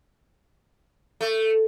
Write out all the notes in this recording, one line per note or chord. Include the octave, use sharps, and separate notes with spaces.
A3